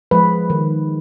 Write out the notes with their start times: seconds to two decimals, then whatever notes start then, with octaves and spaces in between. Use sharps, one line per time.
0.11 F3 G#3 B4
0.50 D#3